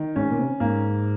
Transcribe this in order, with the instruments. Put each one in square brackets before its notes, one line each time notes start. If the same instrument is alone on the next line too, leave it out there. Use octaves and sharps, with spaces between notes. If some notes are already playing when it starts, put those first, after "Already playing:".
Already playing: [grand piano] D#3
[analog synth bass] G#2 [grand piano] C#4
[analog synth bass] A#2
C3
[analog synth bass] G#2 [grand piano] A#3